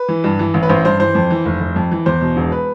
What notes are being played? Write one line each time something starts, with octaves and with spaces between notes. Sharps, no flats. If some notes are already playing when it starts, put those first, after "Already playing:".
Already playing: B4
E3
G2
E3
A1
B4
A1 C5
G2 C5
E3 C5
F2
E3
F1
F1
F2
E3
E2 C5
B2
E1
B4